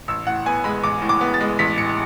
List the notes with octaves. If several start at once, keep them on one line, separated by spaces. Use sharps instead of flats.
A1 E6
A2 F#5
B3 G#5
G#3 B5
A1 D6
A2
D6
B3
A6
G#3
A1 B6
A2 C#7